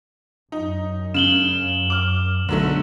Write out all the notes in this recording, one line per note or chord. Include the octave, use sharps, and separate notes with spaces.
F#2 D#4
C#3 E7 F#7 G7
D6 F6
B1 B2 D3 F#3 G#3 A3